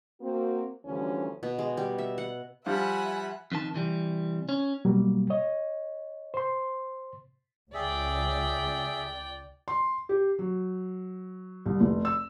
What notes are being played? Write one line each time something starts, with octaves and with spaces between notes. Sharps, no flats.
A#3 C4 F#4
D2 D3 E3 F3 G3 C#4
B2
G#3
G3
E5
F#5
F3 G3 F4 E5 F#5 G#5 B5
F2 D#3 A5
C3 E3 G3
C#4
B2 F#3 G3 A#3
C#5 D#5
C5 C6
C#2 G#4 D5 E5 G5
C6
G4
F#3
C2
F1
E6